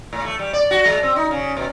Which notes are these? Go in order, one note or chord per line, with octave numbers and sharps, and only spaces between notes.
A2
A3
G3
D5
F#4
G#3
C4
D#4
C#3
B2